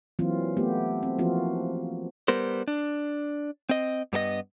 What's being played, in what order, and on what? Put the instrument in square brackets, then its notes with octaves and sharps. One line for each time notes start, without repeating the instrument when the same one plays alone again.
[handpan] E3 F#3 A#3 C4 F4
A3 B3 G4
C4
E3 F3 A#3 C4 F4 F#4
[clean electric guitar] G3 B3 A#4 C5
D4
C4 D#5
G2 B3 A4 D#5